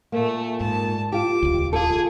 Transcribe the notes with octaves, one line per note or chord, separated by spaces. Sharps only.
A#2 A3 A#3
G#2 A5
F4 G4 D6
D#1 C#2
F4 G#4 A4